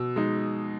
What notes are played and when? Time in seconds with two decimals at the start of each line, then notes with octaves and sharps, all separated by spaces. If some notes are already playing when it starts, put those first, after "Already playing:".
Already playing: B2 E6
0.16 G#3 D#4